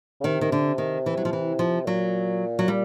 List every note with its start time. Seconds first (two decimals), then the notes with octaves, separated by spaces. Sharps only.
0.21 C#3
0.24 C3 D#3
0.41 D#3
0.52 D3
0.78 D#3
1.06 E3
1.17 F#3
1.25 F3
1.33 E3
1.59 F3
1.87 A#2 F#3
2.59 F#3
2.68 G3